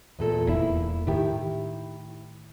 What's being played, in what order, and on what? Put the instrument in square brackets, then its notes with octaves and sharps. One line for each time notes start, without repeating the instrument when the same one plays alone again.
[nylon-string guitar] E2 A#2 A4
[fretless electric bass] D#1 E2 [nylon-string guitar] A#3 E4
[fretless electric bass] A2 D#3 [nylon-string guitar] E4 G4